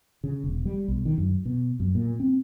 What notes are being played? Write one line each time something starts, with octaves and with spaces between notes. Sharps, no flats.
C#3
E1
G3
B1
D#3
F#2
B2
F#2
A#2
C4